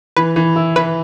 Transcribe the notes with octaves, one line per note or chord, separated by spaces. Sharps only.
E3 B4
E3
E4
E3 B4